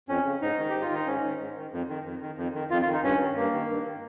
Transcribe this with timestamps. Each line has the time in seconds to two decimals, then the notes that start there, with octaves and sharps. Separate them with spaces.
0.09 F2 C#4
0.26 C#3
0.41 G#2 D#4
0.58 D#3
0.69 G#2 G4
0.81 F4
0.91 D#3 D#4
1.07 G#2 C#4
1.24 D#3
1.40 G#2
1.57 D#3
1.72 F2
1.89 D#3
2.05 F2
2.21 D#3
2.38 F2
2.54 D#3
2.70 F2 F4
2.82 F4
2.87 D#3
2.93 D#4
3.03 G2 C#4
3.20 D#3
3.36 G2 A#3
3.53 D#3
3.69 G2
3.86 D#3